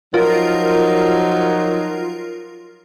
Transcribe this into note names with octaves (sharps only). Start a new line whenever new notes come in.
F3 F#3 D#4 F4 A#4